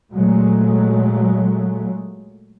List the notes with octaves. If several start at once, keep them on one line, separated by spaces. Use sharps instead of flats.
A#2 F#3 G#3 A3